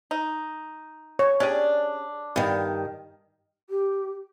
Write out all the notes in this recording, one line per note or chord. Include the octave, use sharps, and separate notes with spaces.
D#4
C#5
C#4 D4 G4 G#4
G2 D#3 B3
G4